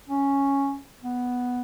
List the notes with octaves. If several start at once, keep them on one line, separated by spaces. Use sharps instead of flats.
C#4
B3